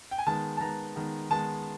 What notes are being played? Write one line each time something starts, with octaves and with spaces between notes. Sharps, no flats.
G5
G#5
D#3 G#3 B3 A5
A5
D#3 G#3 B3 A#5
D#3 G#3 B3
D#3 G#3 B3 A5